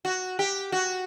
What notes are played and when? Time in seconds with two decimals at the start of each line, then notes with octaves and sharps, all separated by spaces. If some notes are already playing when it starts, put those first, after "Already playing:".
0.05 F#4
0.39 G4
0.72 F#4